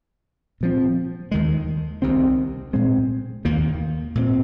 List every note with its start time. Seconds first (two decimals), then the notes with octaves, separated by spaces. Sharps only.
0.61 A#2 F3 C4
1.31 D#2 D#3 G#3
2.02 C2 C3 D#3 C4
2.73 A#2 G#3 C4
3.45 D#2 D#3 A#3
4.15 A#2 G#3 C4